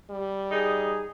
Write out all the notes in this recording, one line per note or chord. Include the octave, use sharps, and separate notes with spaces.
G3
D#4 G#4